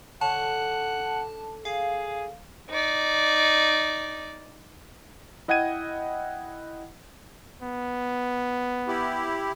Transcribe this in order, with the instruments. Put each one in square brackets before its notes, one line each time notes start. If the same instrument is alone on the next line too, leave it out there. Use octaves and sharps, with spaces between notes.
[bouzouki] D3 C#5 [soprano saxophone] F#5 [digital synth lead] A5
[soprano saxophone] G#4 [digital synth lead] F5
[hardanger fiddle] D#4 D5
[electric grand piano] E4 D#5 F#5 G5 G#6 D#7
[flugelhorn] B3
[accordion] E4 G4